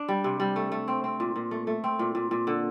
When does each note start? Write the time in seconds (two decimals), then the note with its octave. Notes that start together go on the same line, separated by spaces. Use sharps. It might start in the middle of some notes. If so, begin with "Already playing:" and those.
Already playing: D4
0.08 G3
0.24 C3
0.40 G3
0.56 A3
0.72 A3
0.88 C4
1.04 C4
1.20 A#2
1.36 A#2
1.51 A3
1.67 A3
1.84 C4
1.99 A#2
2.15 A#2
2.31 A#2
2.47 D3